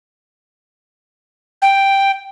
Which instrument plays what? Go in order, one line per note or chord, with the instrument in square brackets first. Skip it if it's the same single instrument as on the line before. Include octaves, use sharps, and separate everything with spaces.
[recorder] G5